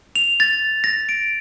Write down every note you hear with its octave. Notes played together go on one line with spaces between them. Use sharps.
F7
A6
A#6
D7